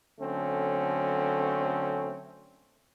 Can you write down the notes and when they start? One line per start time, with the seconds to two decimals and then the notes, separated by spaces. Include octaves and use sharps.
0.20 D3 F#3 A3 C4 C#4